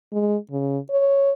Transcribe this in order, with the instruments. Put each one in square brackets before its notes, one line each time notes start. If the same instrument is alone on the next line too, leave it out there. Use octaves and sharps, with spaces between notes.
[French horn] G#3
C#3
C#5